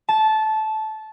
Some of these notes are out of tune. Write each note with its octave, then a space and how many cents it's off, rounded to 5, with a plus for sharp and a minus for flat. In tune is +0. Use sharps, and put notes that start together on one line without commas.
A5 -15